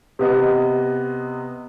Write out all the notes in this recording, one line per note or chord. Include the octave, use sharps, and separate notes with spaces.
C3 B3 D#5